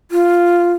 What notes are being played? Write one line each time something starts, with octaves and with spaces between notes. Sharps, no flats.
F4